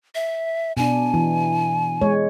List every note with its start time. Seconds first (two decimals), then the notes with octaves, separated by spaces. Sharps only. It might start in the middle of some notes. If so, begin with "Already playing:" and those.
0.15 E5
0.77 B2 D4 G#5
1.14 E3
2.01 G#3 C#5